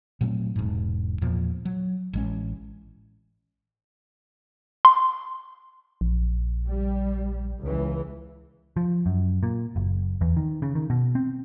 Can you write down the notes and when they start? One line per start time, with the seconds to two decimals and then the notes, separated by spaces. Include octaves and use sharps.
0.21 A#2 F#3 A3 C4
0.56 E1 G#2
1.22 E2 A#2 F3
1.65 F#3
2.13 A1 G#3 C#4
4.85 C6
6.01 A#1
6.66 G3
7.63 C#2 E3
8.77 F3
9.06 F#2
9.43 A#2
9.76 F#1
10.21 E2
10.37 D#3
10.62 C#3
10.75 D#3
10.90 B2
11.15 C4